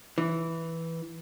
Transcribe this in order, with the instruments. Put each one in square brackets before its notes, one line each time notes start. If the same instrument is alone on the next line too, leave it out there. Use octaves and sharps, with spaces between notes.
[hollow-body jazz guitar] E3